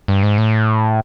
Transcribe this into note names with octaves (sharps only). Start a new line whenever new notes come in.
G2
G#2
A2